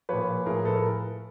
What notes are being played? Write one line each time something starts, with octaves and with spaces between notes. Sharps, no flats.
A#2 F3 B4 C#5
A2 F3 G#4 A#4
A4 B4
A#4